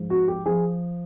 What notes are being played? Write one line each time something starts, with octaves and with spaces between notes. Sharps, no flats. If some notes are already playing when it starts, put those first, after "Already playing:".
Already playing: G#2 F3
F#4
G4
F3 G#4